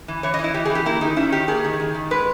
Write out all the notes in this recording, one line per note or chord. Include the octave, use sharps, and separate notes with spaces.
E3
E3 C#5
D#5
E3
E4
E3 G4
G#4
E3
G4
A#3 E4
D#3 D#4
C#4 E4
D#3 G4
A#3 G#4
D#3
D#3
D#3
G#3 B4